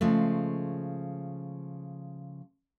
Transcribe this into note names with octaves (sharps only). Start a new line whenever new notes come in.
C#3 F3 G#3 A3